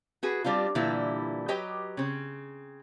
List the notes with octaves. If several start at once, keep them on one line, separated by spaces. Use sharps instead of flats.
F#4 G#4 B4
G3 C4 D4 F4
A#2 D3 E3 G3 E4
F#3 G4 B4 D#5 G5
C#3 C4